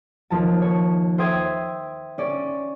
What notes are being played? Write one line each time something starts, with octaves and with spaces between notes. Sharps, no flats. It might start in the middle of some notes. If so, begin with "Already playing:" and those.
D#2 F3 A5
C#5
C5 E5 G5 D#6 G#6
C#4 D5